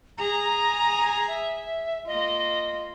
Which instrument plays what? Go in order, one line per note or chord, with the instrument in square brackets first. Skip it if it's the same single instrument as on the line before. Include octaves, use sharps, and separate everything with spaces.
[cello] G#4 [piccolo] A#5
[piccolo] E5
[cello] A#3 F4 [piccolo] D#5